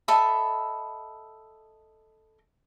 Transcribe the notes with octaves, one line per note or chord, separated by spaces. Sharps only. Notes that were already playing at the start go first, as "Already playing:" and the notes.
A4 D#5 E5 B5